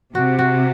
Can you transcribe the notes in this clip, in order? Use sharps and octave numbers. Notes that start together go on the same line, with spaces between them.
C3 F#4
F#4